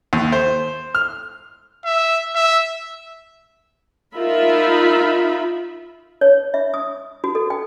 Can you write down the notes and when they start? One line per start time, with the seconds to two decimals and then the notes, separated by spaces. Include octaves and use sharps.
0.13 D#2
0.32 C5
0.95 F6
1.85 E5
2.35 E5
4.17 D#4 F4 A#4 E5 B5
6.21 C#5
6.54 E5
6.74 D#6
7.24 F#4
7.35 A4
7.50 G5